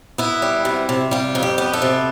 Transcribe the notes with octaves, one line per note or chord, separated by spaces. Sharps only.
B3 E4
G3
C3
C3
G3 F4
F2
G4
B3
A4
C3